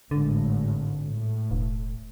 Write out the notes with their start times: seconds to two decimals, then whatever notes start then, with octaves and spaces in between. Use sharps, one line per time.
0.11 G#1 A2 D3
1.03 A2
1.51 E1